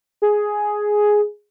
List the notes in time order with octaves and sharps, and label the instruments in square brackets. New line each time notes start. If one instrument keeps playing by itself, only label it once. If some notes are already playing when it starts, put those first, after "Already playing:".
[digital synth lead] G#4